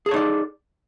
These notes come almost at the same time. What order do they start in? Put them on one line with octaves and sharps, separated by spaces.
G#4 A4 C#5 D#4 D5